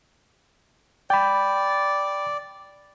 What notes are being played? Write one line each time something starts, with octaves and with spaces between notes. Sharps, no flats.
D5 G5 B5